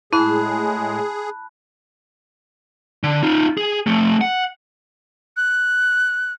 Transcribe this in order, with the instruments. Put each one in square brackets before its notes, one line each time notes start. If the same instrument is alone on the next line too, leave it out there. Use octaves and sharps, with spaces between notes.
[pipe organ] A2 G#3 [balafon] E4 [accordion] G#4 [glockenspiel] A5 B5 F#6
[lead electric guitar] D3
D#4 F4
G#4
F3 A3
F#5
[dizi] F#6